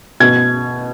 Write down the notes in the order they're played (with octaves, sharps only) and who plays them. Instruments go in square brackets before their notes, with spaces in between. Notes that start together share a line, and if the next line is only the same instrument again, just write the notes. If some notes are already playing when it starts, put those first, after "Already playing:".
[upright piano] B2 G#6